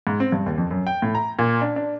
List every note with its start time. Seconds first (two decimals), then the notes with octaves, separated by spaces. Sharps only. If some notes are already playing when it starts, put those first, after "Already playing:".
0.07 G#2
0.20 C4
0.32 G2
0.46 D#2
0.58 F2
0.71 F#2
0.87 G5
1.02 A2
1.15 A#5
1.39 A#2
1.62 D4
1.76 D4